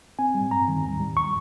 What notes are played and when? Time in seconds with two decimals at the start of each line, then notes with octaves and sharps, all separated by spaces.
0.19 C4 G#5
0.35 G3
0.51 G2 A#5
0.68 D#3
0.84 D#2
1.00 G3
1.17 C#6